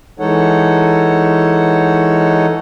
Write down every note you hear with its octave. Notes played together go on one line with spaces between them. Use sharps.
E3 G#3 D#4 A4 C#5 F#5